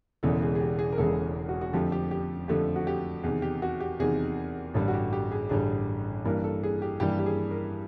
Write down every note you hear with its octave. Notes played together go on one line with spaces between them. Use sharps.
E1 E2 C#3 E3 G#3 A4
G#4
G#4
G4
G#4
A#4
E1 E2 C#3 E3 G#3 A4
F#4
F#4
F2 D3 F3 A3 G4
G4
G4
F2 D3 F3 A3 G4
F#4
G4
E2 C3 D#3 G#4
G4
F#4
G4
E2 C3 D#3 G#4
A1 G2 D3 G3 A4
F#4
G4
G4
G#4
A1 G2 D3 G3 G#4
G2 E3 G3 A#3 A#4
A4
G#4
G4
G2 E3 G3 A#3 G4
G4
G#4
A#4